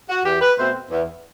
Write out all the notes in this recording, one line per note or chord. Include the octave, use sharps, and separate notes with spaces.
F#4
E2 G4
B4
B2 A3 C4 C5
E2